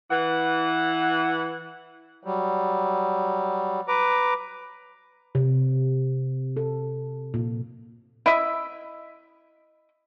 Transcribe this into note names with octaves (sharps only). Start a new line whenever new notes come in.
E3 F#5
F#3 G3
B4 A#5 D6
C3
A4
A#2
E4 D#5 E5